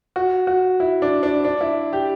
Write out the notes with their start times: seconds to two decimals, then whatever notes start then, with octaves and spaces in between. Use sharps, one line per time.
0.16 F#4
0.47 F#4
0.80 E4
1.02 D4
1.23 D4
1.45 D4
1.61 E4
1.93 G4